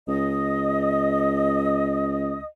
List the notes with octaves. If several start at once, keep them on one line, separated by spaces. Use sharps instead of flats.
C#2 D#5 D#6